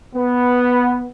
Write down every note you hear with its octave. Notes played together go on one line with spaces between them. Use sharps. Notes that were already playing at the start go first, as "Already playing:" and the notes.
B3